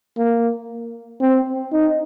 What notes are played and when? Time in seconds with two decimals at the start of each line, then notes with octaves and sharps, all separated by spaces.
0.18 A#3
1.21 C4
1.72 D#4